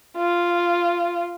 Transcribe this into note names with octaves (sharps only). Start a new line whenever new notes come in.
F4